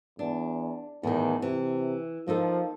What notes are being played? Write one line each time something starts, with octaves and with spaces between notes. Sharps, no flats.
E2 D4
E2 A2 D#3
C3 E3
F3 A#3 D#4 A4